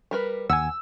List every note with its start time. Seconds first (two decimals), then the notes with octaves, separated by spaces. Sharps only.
0.11 G3 A#4 B4
0.50 D#2 F#5 G#5 E6